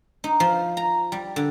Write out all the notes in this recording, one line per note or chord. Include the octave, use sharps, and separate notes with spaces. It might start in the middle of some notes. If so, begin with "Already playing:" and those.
D#4
F3
A#5
G3
D3